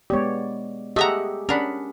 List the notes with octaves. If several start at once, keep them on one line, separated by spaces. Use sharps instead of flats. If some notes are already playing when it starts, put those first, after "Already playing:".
G#3 B3 G4 C#5 D5
A3 G4 G#4 D#5 E5 F#5 A#5
C#4 D4 G#4 A#4 F#5 B5